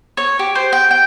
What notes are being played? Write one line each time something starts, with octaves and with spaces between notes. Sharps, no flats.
C#5
G4
C5
G5
G5